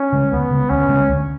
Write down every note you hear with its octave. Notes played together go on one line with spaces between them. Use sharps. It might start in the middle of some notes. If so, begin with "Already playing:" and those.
Already playing: C#4
C#3 G#3
D2 B3
C#3 G#3
D2 C#4
C#3 G#3
D2